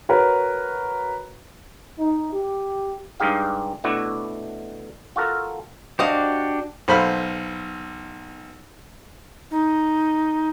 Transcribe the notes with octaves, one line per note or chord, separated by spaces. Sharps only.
F#4 A#4 B4 C#5
D#4
G4
G2 G#3 D#4 G4 F5
B2 A3 D4 E4 F#4
F4 F#4 A4 A#4
D4 F#4 G4 C5 D#5 F5
B1 A4 C5 F5 B5 F6
D#4